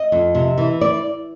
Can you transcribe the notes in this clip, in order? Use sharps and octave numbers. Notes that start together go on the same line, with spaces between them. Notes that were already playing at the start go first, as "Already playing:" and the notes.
Already playing: D#5
F2
C3
E3
D5